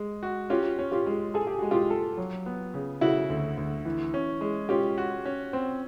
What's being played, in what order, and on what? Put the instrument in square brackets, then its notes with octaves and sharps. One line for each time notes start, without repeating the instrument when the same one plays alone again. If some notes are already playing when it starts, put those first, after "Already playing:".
Already playing: [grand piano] G#3
F#4
[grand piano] C#4 [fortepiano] F4 G4
[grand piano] C#4
[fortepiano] F4 G4
[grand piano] G#3
[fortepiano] G#4 [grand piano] A4
[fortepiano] G4
[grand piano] G#3 [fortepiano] F#4
[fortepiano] F4 G4
[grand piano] A4
F#3
B3
C#3
[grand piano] C#3 [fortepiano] E4 F#4
[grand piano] D2
D2
E3
C#4
G#3
[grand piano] C#4 [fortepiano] F4 G4
[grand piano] F#4
C#4
C4